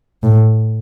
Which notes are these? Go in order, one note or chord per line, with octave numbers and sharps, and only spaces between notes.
A2